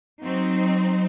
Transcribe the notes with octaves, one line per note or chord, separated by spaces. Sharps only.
F#3 C4 D#4